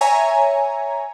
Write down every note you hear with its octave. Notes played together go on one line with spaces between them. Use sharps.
C#5 E5 G#5 A#5